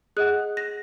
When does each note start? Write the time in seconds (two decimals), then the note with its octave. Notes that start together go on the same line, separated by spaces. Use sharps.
0.17 G#4 D#5 F#5 F#6
0.57 A#6